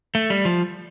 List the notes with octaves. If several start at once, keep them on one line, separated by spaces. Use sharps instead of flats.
A3
G3
F3